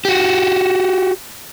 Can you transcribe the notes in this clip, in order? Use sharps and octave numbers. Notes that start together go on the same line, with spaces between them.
F#4 G4